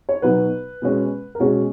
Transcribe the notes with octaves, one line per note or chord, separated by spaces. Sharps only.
C#5
B2 F#3 B3 D#4 B4
B2 G#3 C#4
A#4
B2 G#3 C#4 G#4